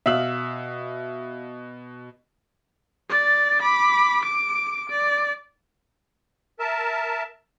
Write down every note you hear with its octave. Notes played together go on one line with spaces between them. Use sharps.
B2 E5 F5 E6 F#7
D5 A6
B5 D6
D6 D7
D5
A#4 E5 A5